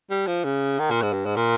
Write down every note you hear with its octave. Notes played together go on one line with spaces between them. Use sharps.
G3
F3
C#3
D#3
A#2
G#2
G2
G#2
A#2